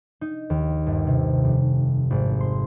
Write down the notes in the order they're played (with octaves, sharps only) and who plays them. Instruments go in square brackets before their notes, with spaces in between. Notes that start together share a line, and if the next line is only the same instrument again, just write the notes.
[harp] D#4
D#2
G1
C3
F1
G#1
C6